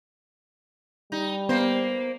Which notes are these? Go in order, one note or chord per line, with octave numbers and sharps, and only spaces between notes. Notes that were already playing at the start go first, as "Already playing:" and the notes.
G3 D#4
A#3 B3 C5